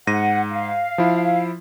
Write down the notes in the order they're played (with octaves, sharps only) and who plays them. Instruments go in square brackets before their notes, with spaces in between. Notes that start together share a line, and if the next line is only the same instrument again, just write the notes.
[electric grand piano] G#2 A#6 D#7 [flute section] F#5
[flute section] F5
[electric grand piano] F3 E4